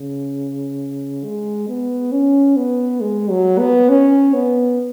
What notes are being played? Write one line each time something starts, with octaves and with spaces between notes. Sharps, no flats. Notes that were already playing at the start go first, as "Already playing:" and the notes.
Already playing: C#3
G#3
B3
C#4
B3
G#3
F#3
B3
C#4
B3